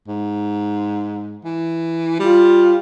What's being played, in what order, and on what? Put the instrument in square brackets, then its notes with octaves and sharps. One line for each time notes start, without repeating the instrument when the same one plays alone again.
[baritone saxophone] G#2
E3
[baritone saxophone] G3 [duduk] F4